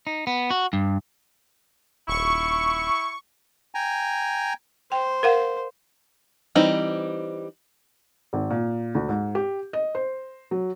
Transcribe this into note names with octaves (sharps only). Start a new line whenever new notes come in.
D#4
B3
F#4
G2
D#1 E4 C#6
G5 G#5 A#5
C5 G5
A#4 F5 F#5
E3 G3 C4 D#4
G#1
A#2
D2
G#2
G4
D#5
C5
F#3